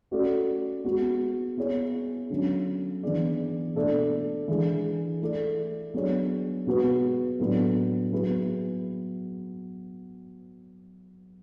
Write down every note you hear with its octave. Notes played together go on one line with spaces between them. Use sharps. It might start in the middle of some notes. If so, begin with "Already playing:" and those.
A3 C#4 F#4 A4 D5
G#3 B3 F#4
B3 E4 G#4 C#5
D3 F#3 C#4
E3 B3 D4 G#4 D5
B2 A3 D4 A4 D5
E3 G#3 D4 G#4
A3 E4 A4 D5
F#3 B3 D4 G#4 C#5
B2 G#3 B3 F#4 B4
A2 F#3 B3 D4
F#3 B3 E4 G#4 B4